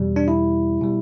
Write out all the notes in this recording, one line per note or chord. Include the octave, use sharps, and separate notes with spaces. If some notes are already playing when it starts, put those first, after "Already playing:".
Already playing: E2 B2 G3
D4
E4
B2 G3